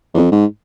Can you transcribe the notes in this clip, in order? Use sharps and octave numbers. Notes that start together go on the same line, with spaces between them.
E2
F2
G#2